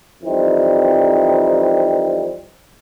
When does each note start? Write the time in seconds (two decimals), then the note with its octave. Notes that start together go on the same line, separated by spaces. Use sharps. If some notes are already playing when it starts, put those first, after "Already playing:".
0.23 F2 E3 G3 C4 D#4